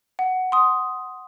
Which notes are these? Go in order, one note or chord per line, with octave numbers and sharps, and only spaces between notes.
F#5
C6 D#6